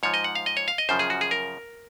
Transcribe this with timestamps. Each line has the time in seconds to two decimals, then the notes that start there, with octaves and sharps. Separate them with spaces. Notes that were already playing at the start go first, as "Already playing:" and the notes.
0.03 G#2 F3 C#5
0.14 D#5
0.24 F#5
0.35 F5
0.46 D#5
0.57 C#5
0.68 F5
0.78 D#5
0.89 F#2 C#3 F3 C5
0.99 G#4
1.10 F#4
1.21 G#4
1.31 A#4